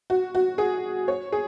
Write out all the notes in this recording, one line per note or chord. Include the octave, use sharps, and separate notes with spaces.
F#4
F#4
G#4
C#5
G#4